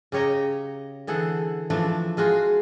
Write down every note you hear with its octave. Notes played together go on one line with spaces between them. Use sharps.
C#3 G4 C#5 D#5 A#5
D3 E3 G#4 A4 F#5
E3 F3 A3 D4
G#3 F4 F#4 G#4